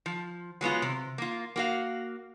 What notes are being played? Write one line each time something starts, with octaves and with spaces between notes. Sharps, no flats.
F3
F#3 G#3 B3 F4
C3
A#3 F4
A#3 F#4 F5